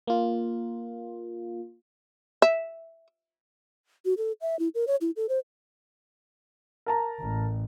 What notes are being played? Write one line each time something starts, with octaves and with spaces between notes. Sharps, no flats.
A#3 F4
E5
F#4
A4
E5
E4
A#4
C#5
E4
A4
C5
A#4 A5 A#5
A1